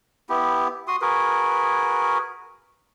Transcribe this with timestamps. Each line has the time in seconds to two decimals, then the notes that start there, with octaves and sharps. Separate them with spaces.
0.29 B3 E4 G4
0.88 F#4 C6 D#6
1.01 F#4 G#4 A#4 B4